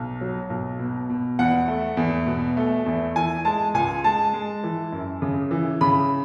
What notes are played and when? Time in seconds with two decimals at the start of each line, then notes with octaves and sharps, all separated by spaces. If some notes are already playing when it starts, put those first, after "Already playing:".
Already playing: B1
0.21 F#3
0.50 B1
0.79 B2
1.10 B2
1.39 E2 F#5
1.68 A3
1.97 E2
2.26 B2
2.57 A3
2.86 E2
3.16 E3 G#5
3.45 G#3 A5
3.74 C#2 G#5
4.04 G#3 A5
4.34 G#3
4.64 E3
4.92 F#2
5.22 C#3
5.51 E3
5.81 C#3 B5